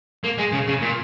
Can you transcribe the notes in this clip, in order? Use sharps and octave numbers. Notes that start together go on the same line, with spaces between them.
A#3
G#3
C#3
C#3
A#2